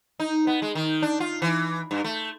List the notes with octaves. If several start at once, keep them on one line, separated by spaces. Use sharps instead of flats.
D#4
B3
G#3
D#3
D4
F4
E3
G2
A3